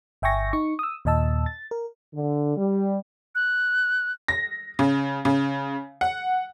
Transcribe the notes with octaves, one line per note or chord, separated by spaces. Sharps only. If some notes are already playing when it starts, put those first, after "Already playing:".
G1 E5 G5 G#5 C#6 A#6
D#4 C#6
D#6 E6
D#2 A#2 D#5 A5 E6
A6
A#4
D3
G3
F#6
A#6
C#3
C#3
F#5